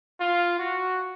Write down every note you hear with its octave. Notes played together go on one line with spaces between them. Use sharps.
F4
F#4